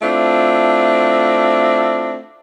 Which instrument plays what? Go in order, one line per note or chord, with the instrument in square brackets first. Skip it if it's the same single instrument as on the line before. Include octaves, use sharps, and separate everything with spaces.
[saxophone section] A3 C4 D4 E4 F4